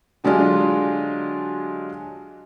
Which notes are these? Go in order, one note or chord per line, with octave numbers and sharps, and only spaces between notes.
D3 F#3 G#3 D4 F4 G4